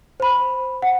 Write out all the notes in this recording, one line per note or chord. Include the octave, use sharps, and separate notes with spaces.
C5 B5
F#5